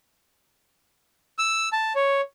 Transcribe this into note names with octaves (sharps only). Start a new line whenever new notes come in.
E6
A5
C#5